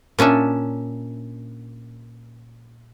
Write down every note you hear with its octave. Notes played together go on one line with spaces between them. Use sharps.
A#2 C#4 D4 E5